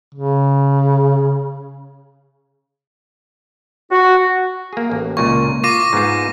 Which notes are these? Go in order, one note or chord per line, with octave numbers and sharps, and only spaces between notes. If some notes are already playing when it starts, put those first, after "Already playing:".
C#3
F#4
A#3 G#4
A1
C#2 A#2 A#3 C#6
F4 D6 A#6 D#7
G#2 B3 F4